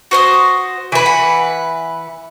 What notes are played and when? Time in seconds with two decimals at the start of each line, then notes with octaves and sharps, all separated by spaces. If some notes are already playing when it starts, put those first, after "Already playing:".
0.11 F#4 C5 D#6
0.92 E3 B4
1.06 F#5